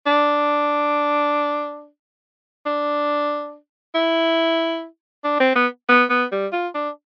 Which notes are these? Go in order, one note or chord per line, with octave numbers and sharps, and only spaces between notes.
D4
D4
E4
D4
C4
B3
B3
B3
G3
F4
D4